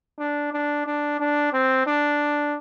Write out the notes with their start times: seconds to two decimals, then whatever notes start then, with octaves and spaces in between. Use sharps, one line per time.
0.19 D4
0.52 D4
0.86 D4
1.20 D4
1.53 C4
1.87 D4